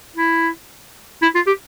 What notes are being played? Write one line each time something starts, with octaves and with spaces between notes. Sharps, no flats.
E4
E4
F4
G4